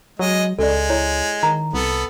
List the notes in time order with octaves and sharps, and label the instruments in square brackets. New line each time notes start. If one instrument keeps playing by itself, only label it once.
[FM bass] F#3 [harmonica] G#3 D#5
[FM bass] C#2 [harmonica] G#3 [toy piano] A4 D5
[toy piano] E4 C#5
[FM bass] D#3 [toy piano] A#5
[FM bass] C2 [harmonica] B3 A4